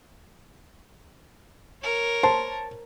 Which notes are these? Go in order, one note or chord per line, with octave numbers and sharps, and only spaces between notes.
A#4 C#5
C5 A5